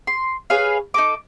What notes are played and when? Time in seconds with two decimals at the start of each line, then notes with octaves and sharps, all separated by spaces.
0.07 C6
0.50 G#4 B4 C#5 F5
0.94 D#4 A4 D6